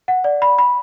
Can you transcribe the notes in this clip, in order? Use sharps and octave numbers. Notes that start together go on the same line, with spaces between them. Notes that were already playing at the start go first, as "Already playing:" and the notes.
F#5
D5
B5
B5